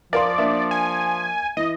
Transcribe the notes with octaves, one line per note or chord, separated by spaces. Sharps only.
F3 A#4 D5 F5 C6
A#3 D4 E5
G#5
E3 D#5